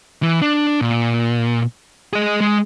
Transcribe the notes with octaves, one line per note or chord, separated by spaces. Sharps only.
E3
D4
A#2
G#4 D#5
G#3